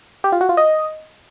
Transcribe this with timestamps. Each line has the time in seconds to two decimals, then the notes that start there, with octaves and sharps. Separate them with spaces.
0.24 G4
0.32 F4
0.41 F#4
0.49 F4
0.57 D#5